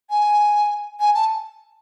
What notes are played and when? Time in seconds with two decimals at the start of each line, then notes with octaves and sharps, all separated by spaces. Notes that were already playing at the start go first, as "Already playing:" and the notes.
0.10 G#5
1.00 G#5
1.15 A5